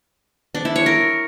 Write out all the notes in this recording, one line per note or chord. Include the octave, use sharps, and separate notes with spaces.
D4
E4
C#5
A#4